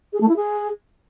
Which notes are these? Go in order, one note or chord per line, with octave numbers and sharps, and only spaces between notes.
G#4
A3
E4
G#4